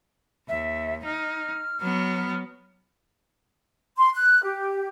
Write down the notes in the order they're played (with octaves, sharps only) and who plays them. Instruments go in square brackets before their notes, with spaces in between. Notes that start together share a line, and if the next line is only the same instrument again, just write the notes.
[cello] D#2 [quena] E5
[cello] D#4 [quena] F6
[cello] F#3 B3
[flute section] C6
F#6
G4